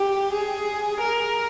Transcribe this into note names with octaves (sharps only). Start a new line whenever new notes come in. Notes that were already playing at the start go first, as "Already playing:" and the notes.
Already playing: G4
G#4
A#4